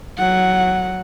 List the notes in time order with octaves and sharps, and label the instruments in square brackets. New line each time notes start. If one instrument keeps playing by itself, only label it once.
[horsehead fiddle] F#3 F#5